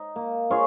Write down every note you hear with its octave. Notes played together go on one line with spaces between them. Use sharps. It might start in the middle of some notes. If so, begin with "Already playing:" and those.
Already playing: D#4
A#3
F4 G#4 C#5